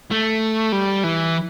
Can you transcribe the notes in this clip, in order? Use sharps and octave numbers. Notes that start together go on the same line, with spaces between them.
A3
G3
E3